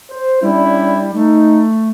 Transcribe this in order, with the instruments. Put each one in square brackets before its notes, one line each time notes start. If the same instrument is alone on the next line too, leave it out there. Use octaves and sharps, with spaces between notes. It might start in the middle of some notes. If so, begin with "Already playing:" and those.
[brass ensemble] C5
[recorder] G3 [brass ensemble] C#4 D4 E4
[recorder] A3 [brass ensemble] D#4